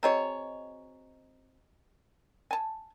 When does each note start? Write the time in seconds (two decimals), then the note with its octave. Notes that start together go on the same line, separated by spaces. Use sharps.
0.03 C4 F#4 G#4 C#5 D#5 A#5
2.51 G#5 A5